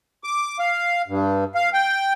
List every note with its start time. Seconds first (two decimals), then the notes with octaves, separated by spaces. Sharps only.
0.24 D6
0.59 F5
1.08 G2
1.55 F5
1.73 G5